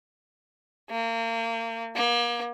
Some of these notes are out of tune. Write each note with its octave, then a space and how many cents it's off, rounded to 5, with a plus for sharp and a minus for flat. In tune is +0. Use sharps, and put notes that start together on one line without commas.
A#3 -35
A#3 +35